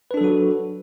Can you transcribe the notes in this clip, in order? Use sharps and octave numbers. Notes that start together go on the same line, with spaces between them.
F#3 D4 F#4 A4 B4